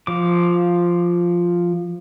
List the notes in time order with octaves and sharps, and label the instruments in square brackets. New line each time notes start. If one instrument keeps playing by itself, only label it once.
[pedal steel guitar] F3 D6